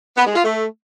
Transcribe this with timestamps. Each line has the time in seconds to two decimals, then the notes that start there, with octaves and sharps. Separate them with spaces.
0.17 B3
0.26 G#3
0.35 F4
0.44 A3